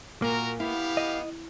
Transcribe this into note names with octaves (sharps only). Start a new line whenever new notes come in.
A#2 A#3 F#4 A#4
B3 E4 G4 F5
D#5